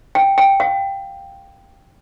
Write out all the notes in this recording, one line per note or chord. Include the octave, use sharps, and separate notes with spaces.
G5
G5
F5